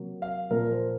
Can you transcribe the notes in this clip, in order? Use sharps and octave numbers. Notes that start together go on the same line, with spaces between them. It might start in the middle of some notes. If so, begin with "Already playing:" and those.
Already playing: C3 F#3 A#3
F5
A#2 F3 A#3 A#4
C5